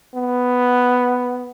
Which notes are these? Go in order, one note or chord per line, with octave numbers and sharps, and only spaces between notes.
B3